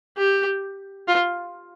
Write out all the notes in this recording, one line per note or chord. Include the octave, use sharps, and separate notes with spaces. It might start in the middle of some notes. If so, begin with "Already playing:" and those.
G4
F4